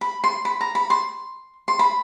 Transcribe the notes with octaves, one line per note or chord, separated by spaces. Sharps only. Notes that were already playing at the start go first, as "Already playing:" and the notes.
B5
C6
B5
A#5
B5
C6
C6
B5